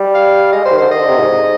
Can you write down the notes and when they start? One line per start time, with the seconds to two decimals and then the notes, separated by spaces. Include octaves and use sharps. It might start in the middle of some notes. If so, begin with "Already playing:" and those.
Already playing: G3
0.15 F5
0.53 G#3 D#5
0.63 G3 C5
0.72 D#3
0.77 D3 C5
0.90 D#3 D#5
1.00 D3
1.09 C3
1.18 G#2